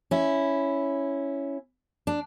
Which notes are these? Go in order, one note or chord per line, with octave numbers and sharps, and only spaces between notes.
C#4 E4
D4